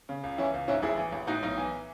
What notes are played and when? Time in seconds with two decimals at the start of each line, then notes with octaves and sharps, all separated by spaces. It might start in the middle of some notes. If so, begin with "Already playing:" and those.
0.09 C#3
0.23 C#2
0.38 E3 C#4 E4
0.54 C#2
0.68 G#2 C#4 E4
0.83 A1 E4 G#4
0.98 E3
1.12 A1
1.27 A2 D#4 F#4
1.43 B1 D#4
1.57 E3